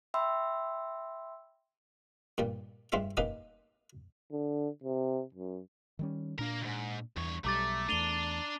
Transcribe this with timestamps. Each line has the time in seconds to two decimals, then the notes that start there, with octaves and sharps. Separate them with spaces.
0.14 E5 G5 B5 C6 E6
2.38 G2 A#2 G3
2.92 G2 G#3 C4 F4 E5
3.17 A#3 C#4 D#4 G4 B4 D#5
4.32 D3
4.84 C3
5.34 F#2
5.99 D#3 G3 C#4
6.39 A#2 A#3 D4 A#4
6.62 C#2 G#2
7.17 E2 G2 C#5
7.45 B1 G3 A3 A#5 D6 A6
7.89 E2 A3 D4 D#7 F7 G7